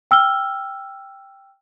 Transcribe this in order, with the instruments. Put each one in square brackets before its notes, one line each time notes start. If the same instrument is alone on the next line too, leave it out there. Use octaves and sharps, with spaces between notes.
[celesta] G5 E6 F6 G7